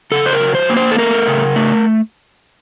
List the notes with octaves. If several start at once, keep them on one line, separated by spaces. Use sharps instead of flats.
C#3 A4
C5
A#4
F#3
C5
A#3
C5
A4
A3 A#4
C#3
A3